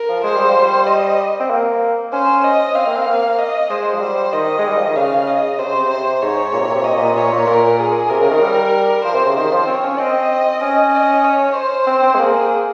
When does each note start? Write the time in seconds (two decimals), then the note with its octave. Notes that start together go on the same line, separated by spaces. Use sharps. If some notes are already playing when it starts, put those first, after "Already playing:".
Already playing: A#4
0.09 F3
0.24 G#3 C5
0.36 G3
0.49 F3
0.60 G3
0.87 D#5
1.40 C4
1.50 A#3
2.13 C#4 C5
2.44 D#5
2.75 C4 F5
2.87 A#3
2.96 C4
3.06 A#3
3.38 D#5
3.70 G#3 C5
3.94 F3
4.01 G3 C5
4.33 D#3 D#5
4.59 G#3
4.68 G3
4.77 F3
4.86 D#3
4.96 C#3 F5
5.27 D#5
5.58 C3 C5
5.66 C#3
5.74 C3
5.90 C5
6.22 G#2 C#5
6.53 A#2
6.59 C3
6.67 A#2
6.75 C3
6.82 A#2 D#5
6.89 C3
6.96 A#2
7.16 A#2 C#5
7.32 A#2
7.46 A#2 A#4
7.79 G#4
8.09 C3 A#4
8.20 C#3
8.31 D#3
8.41 G3
9.04 F3 C5
9.14 C3
9.26 C#3
9.36 D#3 C5
9.51 F3
9.67 C4 C#5
9.83 C#4
9.98 C4 D#5
10.61 C#4 D#5
10.93 D#5
11.24 C#5
11.56 C5
11.87 C4
12.03 C4
12.15 G#3
12.19 A#3 G#4